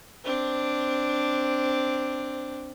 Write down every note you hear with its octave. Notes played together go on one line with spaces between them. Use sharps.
C4 D4